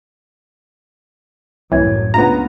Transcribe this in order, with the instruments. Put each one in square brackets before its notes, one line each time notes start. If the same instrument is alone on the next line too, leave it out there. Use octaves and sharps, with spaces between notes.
[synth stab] C2 E3 [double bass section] F#2 A2 [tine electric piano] C#5 G#6
[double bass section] C#2 G#3 [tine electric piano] A3 C#4 D4 [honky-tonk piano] B3 F4 [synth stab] A#5